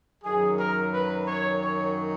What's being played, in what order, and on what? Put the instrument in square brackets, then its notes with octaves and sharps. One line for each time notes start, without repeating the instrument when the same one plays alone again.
[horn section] F#2 D#3 F#3 G#4
A#4
B4
C#5
C#5